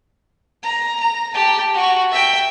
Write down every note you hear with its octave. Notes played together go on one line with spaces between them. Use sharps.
A#5
A#5
G4 A5
F#4 C#6
E5 G5